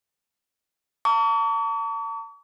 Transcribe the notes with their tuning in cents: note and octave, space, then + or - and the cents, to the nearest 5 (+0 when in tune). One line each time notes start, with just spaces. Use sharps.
A5 +45 C#6 +45